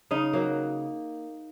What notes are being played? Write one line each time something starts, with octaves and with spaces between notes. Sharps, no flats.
C#3 D#4
F#3 A#3